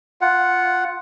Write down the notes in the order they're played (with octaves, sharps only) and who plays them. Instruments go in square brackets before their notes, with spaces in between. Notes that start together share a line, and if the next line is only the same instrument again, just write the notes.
[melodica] F4 F#5